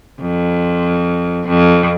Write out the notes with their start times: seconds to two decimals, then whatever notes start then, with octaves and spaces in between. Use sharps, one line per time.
0.21 F2
1.47 F2